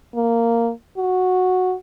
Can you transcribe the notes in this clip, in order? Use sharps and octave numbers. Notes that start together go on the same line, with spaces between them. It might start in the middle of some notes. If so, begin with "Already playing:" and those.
A#3
F#4